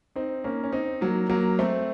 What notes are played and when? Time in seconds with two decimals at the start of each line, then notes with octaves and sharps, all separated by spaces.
0.16 C4 D#4
0.44 A#3 C#4
0.64 C#4
0.73 C4 D#4
1.01 F#3 A#3
1.30 F#3 A#3
1.59 A3 C4